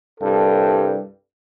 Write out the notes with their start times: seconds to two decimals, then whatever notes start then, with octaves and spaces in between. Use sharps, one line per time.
0.19 C2 G2 A4